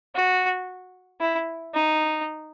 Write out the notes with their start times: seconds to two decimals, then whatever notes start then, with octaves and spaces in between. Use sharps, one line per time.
0.15 F#4
1.21 E4
1.75 D#4